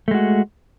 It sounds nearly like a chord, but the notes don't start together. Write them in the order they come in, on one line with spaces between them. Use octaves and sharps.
A3 G#3 F#4